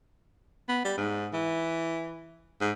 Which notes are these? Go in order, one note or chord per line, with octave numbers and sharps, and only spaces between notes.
B3
G3
G#2
E3
G#2